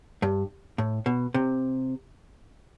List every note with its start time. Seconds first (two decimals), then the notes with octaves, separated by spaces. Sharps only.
0.22 G2
0.78 A2
1.06 B2
1.34 C3